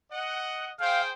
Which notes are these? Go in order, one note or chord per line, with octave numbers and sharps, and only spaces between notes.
D#5 F#5
G#4 C5 F5 G5